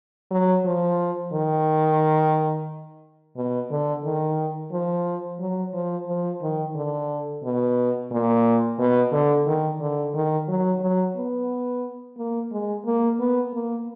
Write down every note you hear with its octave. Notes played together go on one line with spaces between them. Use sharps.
F#3
F3
D#3
B2
D3
D#3
F3
F#3
F3
F3
D#3
D3
B2
A#2
B2
D3
D#3
D3
D#3
F#3
F#3
B3
A#3
G#3
A#3
B3
A#3